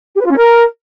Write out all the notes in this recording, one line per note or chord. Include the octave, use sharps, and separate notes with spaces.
G4
B4
F4
C#4
A#4